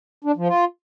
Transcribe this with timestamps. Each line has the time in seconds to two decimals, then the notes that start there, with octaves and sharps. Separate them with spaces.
0.24 D4
0.36 F3
0.48 F4